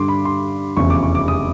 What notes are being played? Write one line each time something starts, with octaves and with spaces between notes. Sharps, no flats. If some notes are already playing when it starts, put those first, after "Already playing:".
Already playing: G2 D3 G3 C6 D6
B5
C6
F1 E2 C#3 F3 C#6
D6
C#6
D6
D#6